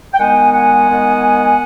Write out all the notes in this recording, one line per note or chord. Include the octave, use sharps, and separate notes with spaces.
G5
D#3 G#3 B3 F#5 G#5
F#5 G#5
D#3 G#3 B3